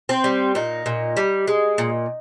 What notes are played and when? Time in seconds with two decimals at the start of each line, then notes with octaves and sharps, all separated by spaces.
0.09 C4
0.24 G3
0.55 A#2 D#4
0.86 A#2
1.17 G3
1.47 G#3
1.78 A#2